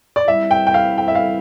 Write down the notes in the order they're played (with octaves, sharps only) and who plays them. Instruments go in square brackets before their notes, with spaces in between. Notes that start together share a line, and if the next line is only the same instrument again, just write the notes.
[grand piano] D5
[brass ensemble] G3 C4 E4 [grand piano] E5
[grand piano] G5
G5
F5
G5
E5
F5